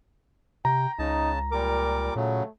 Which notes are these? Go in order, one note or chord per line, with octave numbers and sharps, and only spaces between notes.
C3 G5 A#5
C#2 C#3 D#4 A5
A#2 G3 A#4 D6
A#2 C#3 F#3 A3